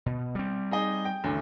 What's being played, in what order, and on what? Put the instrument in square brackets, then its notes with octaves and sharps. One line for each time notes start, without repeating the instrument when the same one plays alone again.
[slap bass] B2
G3 C4
[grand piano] D#4 G#4 D#5
G5
A1 D2